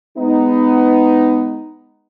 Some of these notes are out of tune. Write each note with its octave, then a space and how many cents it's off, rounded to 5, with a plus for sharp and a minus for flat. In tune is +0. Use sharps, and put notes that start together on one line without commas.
G#3 +0 B3 +20 D#4 +0